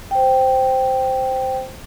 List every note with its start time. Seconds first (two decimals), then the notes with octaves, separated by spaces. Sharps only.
0.11 C5 G5